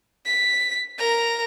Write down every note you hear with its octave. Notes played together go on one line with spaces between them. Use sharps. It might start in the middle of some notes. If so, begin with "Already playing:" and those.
B6
A#4 A#5